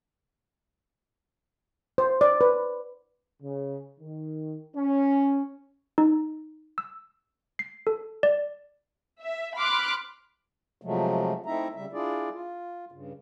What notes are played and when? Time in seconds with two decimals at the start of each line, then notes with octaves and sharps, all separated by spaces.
1.98 C5
2.21 D5
2.41 B4
3.41 C#3
4.00 D#3
4.76 C#4
5.98 D#4
6.78 E6
7.59 C7
7.87 A4
8.23 D5
9.21 E5
9.56 B5 C6 D6 F6 F#6
10.82 C3 F3 F#3 G#3 A3
11.46 A3 C4 D#4 E4 E5 A#5
11.75 C#3 G3 E5
11.93 D4 E4 F4 G#4 D5
12.33 F4
12.92 G2 C#3